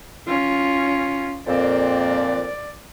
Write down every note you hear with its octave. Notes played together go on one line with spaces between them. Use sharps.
C#4 F4
F2 A#2 C4 D5